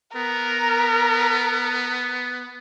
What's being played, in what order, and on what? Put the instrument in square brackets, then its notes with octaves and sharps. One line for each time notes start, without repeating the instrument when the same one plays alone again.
[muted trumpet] B3 [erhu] A#4